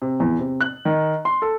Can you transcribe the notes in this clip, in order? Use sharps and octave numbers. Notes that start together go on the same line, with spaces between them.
C3
E2
C3
F#6
D#3
C6
A4